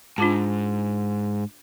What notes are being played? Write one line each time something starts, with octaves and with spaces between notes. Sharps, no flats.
G#2 D4 F4 A5